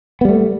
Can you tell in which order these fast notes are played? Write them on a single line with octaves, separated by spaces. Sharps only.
B3 G3 A3